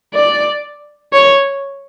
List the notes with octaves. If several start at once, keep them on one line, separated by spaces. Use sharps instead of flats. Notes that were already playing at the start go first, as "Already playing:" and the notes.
D5
C#5